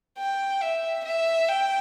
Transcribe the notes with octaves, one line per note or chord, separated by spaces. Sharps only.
G5
E5
E5
G5